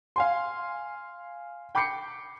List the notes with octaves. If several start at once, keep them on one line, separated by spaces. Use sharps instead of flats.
F5 G#5 C6
G5 B5 D6 G6 C7 C#7